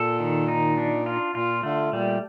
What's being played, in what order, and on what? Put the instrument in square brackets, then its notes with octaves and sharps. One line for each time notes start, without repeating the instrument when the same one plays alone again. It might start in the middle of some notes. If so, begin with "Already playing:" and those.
Already playing: [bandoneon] A#2 [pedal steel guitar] A4
[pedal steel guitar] D#3
D#4
D4
F4
[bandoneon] A#2 [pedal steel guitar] F4
[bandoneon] D3 [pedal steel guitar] A3
[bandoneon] A#2 [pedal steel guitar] G3